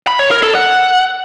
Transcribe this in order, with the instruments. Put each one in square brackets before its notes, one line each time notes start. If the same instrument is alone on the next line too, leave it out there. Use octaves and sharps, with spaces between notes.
[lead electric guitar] B5
C#5
A#4
A4
F#5